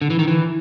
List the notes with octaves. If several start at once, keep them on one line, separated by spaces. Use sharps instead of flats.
D3
E3
D#3
E3